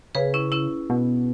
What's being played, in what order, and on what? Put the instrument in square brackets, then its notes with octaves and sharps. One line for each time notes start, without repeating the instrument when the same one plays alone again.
[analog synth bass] C#3 [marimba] G#4 B4
[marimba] C#4 E4
C#4 E4
[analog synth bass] B2